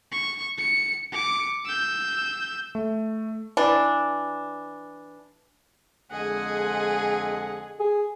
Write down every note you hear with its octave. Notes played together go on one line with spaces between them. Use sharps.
C#6
C#7
D6 C#7
E6 G6
A3
E3 D4
F2 D3 G#3 G#4 D#5 F#5
G#4